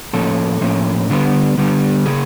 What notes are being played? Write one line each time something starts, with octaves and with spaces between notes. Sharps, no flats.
A2 F3 A#3 C#4 A4
A2 F3 A#3 C#4
D3 G3 B3
D3 G3 B3
C#3 A#3 G#4